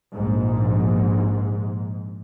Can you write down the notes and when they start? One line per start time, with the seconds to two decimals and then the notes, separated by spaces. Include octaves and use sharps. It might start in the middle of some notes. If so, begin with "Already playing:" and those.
0.13 A#1 G#2